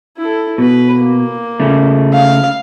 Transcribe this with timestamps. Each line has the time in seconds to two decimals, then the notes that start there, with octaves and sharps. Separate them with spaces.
0.18 E4 A4
0.58 B2 B4
0.97 A#3
1.60 C#3 A3
2.13 F5